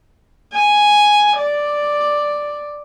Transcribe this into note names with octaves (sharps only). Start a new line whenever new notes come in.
G#5
D5